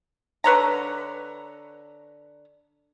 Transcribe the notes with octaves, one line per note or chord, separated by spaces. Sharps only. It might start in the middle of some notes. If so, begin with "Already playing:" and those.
D3 B4 C#5 A#5